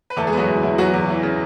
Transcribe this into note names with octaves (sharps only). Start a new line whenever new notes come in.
B4
E2 A3 A4
G#3 G#4
F#3 B3 F#4
E2 E4
E2 E4
F#3 B3 F#4
E2
E3
C#3